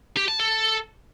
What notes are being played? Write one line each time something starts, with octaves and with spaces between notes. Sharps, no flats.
G4
A5
A4